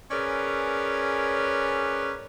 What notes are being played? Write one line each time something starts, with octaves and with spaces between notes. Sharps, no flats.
C#4 G#4 A#4 B4 C#5 D5